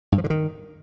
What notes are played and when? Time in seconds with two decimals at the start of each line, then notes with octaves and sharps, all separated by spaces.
0.12 G2
0.18 F3
0.24 D3
0.30 D#3